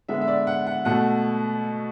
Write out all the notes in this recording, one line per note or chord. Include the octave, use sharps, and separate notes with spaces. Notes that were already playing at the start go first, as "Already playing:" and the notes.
D3 G#3 B3 E5
E5
D5
F#5
F#5
B2 A3 F#5